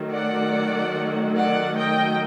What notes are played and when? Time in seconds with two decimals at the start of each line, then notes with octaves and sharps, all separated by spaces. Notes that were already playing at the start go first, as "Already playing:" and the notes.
Already playing: D#3 F#3 A3
0.10 D5 F#5
1.36 D5 F#5
1.77 D#5 G5